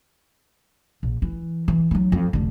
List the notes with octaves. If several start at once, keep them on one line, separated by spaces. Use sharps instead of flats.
A#1
E3
E3
F#3 D#4
F2
F1 D3